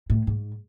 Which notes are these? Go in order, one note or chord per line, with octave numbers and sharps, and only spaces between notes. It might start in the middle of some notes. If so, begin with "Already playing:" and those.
A2
G#2